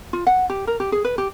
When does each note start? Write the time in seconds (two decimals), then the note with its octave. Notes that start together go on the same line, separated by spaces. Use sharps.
0.13 F4
0.27 F#5
0.50 G4
0.67 A#4
0.80 G4
0.92 G#4
1.04 B4
1.18 G4